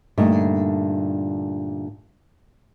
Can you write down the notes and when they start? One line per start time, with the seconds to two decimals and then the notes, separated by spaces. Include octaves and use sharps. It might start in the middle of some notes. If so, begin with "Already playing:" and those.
0.18 G2 A#2 D3 A3 D#4